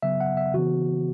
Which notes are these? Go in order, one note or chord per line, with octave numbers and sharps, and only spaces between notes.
C#3 F#3 B3 E5
F#5
E5
C#3 E3 B3 F#4